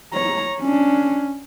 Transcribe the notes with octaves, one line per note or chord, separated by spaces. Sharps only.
C#5 A#5
C#4 D4